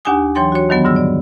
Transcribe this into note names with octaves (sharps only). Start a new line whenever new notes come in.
D#2 D4 G4 F#5 G#5 D#6
E3 F#3 C#5 G5 C6 A6
F#4 C#5
F2 D#3 F#3 B3
G#2 D3 G3 E6
D5